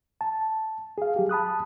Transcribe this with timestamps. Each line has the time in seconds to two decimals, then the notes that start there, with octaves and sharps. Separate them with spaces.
0.21 A5
0.98 G#4 F5
1.16 F#3 G4
1.29 A5 B5 D#6 F#6